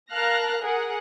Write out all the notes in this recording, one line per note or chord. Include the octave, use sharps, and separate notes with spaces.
A#4 F5 A5 F6 F#6 A#6
G#4 A#4 F#5